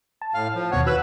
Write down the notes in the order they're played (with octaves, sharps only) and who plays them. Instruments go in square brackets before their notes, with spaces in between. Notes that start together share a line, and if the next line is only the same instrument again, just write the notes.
[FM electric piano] A5
[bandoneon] A2 F5
F3
[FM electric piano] D#2 B2 F#5 [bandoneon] C#5
[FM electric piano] F#4 E6 F#6 [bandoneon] B4 B5